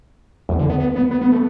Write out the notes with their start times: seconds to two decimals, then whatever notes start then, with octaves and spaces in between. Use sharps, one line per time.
0.49 E2
0.59 D3
0.70 B3
0.80 B3
0.96 B3
1.11 B3
1.21 B3
1.32 A3